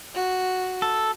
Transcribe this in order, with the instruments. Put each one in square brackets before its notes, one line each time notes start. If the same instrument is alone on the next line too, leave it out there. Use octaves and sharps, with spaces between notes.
[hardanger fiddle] F#4
[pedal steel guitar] A4